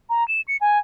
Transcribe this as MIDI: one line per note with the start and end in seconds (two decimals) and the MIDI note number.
0.10 0.26 82
0.28 0.41 100
0.48 0.57 97
0.61 0.79 80